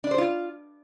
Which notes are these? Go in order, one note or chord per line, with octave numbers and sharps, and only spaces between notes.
D4
C5
F4